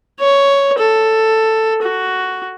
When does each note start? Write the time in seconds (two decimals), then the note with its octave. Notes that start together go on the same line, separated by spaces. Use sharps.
0.20 C#5
0.78 A4
1.82 F#4